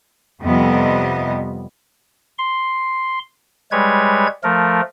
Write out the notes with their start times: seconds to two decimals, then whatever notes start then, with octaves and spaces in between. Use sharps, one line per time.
0.42 F2 C3 G3 B3 D#5
2.39 C6
3.72 G3 G#3 B4 C#5 G#6
4.44 F3 A3 A#4